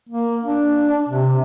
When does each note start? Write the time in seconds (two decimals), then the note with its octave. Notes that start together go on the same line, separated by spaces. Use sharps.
0.09 A#3
0.43 D4
1.09 C3